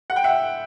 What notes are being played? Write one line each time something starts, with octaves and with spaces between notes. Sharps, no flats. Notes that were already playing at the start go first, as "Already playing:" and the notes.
F#5
G5
E5 F#5